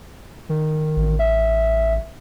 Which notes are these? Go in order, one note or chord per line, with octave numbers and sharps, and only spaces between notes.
D#3
A1
E5